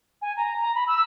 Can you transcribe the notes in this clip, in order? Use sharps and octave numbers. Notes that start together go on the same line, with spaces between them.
G#5
A#5
A#5
B5
E6